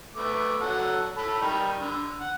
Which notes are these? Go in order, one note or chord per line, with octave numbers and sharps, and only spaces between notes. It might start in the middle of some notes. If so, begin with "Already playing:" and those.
A3 B3 D6
F#3 A4 F#5
A4 B5
D#3 G3 D#4
D3
F#5